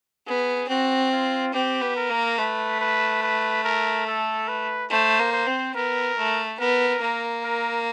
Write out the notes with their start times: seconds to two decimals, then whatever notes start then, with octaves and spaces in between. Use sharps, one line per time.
0.27 B3 G#4
0.69 C4 F#4
1.12 F4
1.53 C4 G4
1.81 B3
1.96 A#4
2.10 A#3
2.38 A3 B4
2.81 B4
3.22 B4
3.64 A#4
4.07 A4
4.48 B4
4.91 A3 C5
5.19 A#3
5.33 C5
5.46 C4
5.75 B3 A#4
6.17 A3
6.60 B3 A#4
7.02 A#3
7.44 A#4